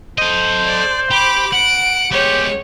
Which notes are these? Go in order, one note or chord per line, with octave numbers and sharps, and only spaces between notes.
A4 C5 D#5
D5
G4 B5 D6
F#5 D7
G#3 B3 G4 C#5